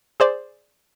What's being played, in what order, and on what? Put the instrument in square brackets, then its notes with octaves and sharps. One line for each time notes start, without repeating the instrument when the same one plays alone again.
[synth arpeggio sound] G#4 C5 D5